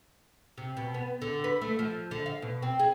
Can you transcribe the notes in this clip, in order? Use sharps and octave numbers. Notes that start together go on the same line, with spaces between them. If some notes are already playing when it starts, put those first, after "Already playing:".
C3
B2
B3
D3
B4
A3
F3
D3
F5
B2
C4
G#4